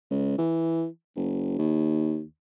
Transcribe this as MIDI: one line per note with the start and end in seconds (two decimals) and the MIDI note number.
0.11 0.37 37
0.38 0.86 52
1.16 1.53 30
1.58 2.23 39